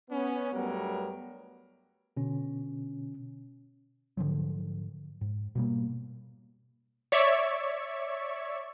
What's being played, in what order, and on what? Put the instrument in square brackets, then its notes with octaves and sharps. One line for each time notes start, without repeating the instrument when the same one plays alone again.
[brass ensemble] B3 C#4
G2 F#3 G3 A3 B3 A#4
[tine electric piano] B2 D3 C#4
[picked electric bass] G#2 D3 F3 F#3
G#2
B2 G3 A#3
[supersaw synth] C#5 D5 E5 C#6